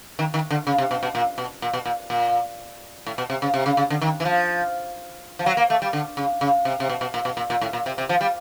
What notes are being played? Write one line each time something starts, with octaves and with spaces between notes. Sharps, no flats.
D#3
D#3
D3
C#3
C3
B2
B2
A#2
B2
A#2
B2
A#2
A#2
A2
B2
C3
C#3
C3
C#3
C#3
D3
D#3
E3
F3
F3
F#3
A#3
A3
G3
D3
C#3
C#3
C3
C3
B2
B2
A#2
B2
A#2
A#2
A2
A#2
C3
C3
F3
G3